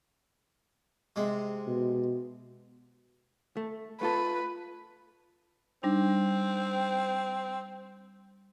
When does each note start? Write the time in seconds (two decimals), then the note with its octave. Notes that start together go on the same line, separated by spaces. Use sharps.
1.16 C3 G#3
1.67 B2
3.57 A3
4.01 A3 F4 A4 B4
5.83 G3 C4 D4 D#4